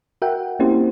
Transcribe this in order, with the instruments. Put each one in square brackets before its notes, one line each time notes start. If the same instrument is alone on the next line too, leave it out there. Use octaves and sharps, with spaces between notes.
[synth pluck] F#4 A#4 E5 F#5 G5
A#3 C4 C#4 E4 G4 C5